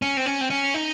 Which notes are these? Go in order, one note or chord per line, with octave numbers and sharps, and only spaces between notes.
C#4
C4
C#4
C4
C#4
D#4